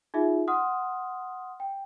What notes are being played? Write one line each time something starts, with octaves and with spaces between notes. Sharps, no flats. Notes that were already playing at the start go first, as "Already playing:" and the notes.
D#4 F4 G#4 E5
F#5 C6 D#6 F6
G5